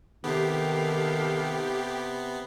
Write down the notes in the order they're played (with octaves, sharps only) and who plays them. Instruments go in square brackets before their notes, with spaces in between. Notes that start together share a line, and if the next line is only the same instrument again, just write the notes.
[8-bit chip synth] C3 B3 [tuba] D#3 [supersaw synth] G4 [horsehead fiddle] A4 F5